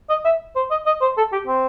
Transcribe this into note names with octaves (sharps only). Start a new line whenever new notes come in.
D#5
E5
C5
D#5
D#5
C5
A4
G4
C4